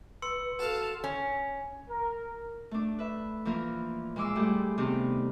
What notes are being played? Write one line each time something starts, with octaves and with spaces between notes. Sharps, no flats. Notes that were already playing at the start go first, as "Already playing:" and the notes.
B4 C6 E6 C#7
F#4 A4 F5 A5
C#4
A#4
A3 D4
B4 E5
E3 F3 A#3 A#4
A#2 G#3 C6 D6 E6
G3 A3 E4 G4 G#4
C3 D#3 B3 D4 D#4 G4